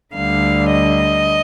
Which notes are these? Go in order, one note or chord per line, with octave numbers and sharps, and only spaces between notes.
D2 D3 G3 F5
D#5